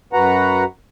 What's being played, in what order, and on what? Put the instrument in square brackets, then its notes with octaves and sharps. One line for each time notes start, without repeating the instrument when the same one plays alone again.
[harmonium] F#2 F#4 B4 F#5 A#5